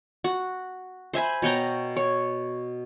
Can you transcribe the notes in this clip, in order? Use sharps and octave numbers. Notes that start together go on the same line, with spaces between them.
F#4
C5 E5 G#5 B5
B2 C#5 G5 A#5
C#5